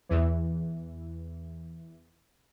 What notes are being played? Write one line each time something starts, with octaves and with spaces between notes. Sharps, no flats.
E2 E3